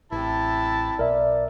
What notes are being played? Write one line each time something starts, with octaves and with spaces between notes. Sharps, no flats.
A1 C3 E4 A5
B1 A#4 D5 E5